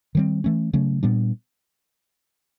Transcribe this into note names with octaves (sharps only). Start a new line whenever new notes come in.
D#3 G3 C4
E3 A3 C#4
C#3 F#3 A3 C#4
A#2 G3 B3 D4